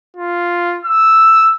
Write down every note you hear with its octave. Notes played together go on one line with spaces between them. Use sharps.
F4
E6